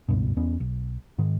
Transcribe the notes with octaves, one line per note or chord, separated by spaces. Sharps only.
F#1 C#2 G2 B2
E2 B3 C#4
B1
G#2 D#3